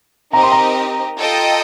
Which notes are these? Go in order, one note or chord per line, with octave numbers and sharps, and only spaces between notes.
C4 D#4 G4 A#4 D#5 A#5
C6
A#5
F4 A4 D#5 G5